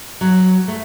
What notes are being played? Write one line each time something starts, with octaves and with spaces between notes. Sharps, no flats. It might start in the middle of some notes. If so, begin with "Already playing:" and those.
F#3
A3